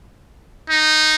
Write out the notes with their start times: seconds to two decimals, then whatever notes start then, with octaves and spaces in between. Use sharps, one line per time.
0.70 D#4